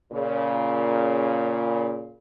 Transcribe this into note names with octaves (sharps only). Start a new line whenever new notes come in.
A#2 C#3